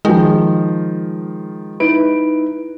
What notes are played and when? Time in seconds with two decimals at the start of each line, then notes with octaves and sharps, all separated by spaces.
0.05 D#3 F3 G#3
1.80 D#4 E4 B4 D7